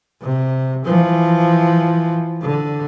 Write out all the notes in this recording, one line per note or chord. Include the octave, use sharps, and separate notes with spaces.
C3
E3 F3
D3